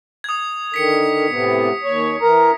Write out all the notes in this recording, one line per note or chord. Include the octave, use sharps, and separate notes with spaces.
D#6 G#6
D3 D#3 B6 C#7
A2 C3 B3
D#2 C#5
E3 A#4 A#5